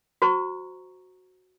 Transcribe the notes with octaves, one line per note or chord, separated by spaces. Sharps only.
F#4 C5 A#5 C#6